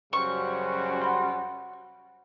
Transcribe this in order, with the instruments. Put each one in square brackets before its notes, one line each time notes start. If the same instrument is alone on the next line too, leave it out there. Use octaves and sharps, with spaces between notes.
[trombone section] F#2 C#3 C5 [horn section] G3 C#4 F#4 [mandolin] C#6
[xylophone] F#5 B5 C6